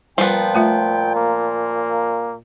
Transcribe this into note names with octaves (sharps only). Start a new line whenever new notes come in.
A#2 F3 G3 B3 G5
A3 F4 E5
A#3